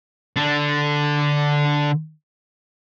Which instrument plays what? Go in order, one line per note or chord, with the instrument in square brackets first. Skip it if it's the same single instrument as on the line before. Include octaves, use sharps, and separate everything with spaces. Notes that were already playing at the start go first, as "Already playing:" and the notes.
[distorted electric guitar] D3 D4